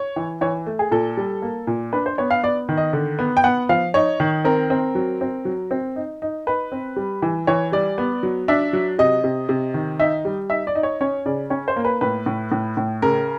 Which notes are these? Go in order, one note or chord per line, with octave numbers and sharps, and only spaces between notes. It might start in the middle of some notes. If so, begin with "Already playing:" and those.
Already playing: C#5
E3
E3 C#5
A3
G#4
A#2 A4
G3
A#3
A#2
D4 B4
C5
B3 C#5
F5
B3 D5
D#3
D#5
D3
B3
G5
B3 F#5
F3 F5
D#4 C#5
D#3
C4 A#4
C4
F#3
C4
F#3
C4
D#4
D#4
D#4 B4
C4
G3
E3
E3 C#5
G3 D5
B3
F#3
D4 E5
F#3
C3 D#5
C3
C3
D#3
D#4 E5
G3
D#4 E5
D5
D#4
C#5
C#4 C#5
C#3 D5
C#4 C#5
C5
A#3
B4
A2 B4
A2
A2
A2
C#3 A#4